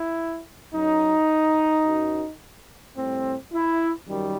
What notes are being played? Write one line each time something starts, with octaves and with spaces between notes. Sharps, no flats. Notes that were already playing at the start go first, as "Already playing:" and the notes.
Already playing: E4
F#2 F#3 D#4
F#2 F#3
A2 G3 C4
E4
F#2 D#3 G3